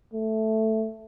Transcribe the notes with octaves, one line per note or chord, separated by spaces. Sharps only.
A3